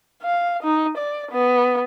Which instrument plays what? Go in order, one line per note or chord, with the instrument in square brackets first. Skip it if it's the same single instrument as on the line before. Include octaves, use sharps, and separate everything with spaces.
[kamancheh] F5
D#4
D5
B3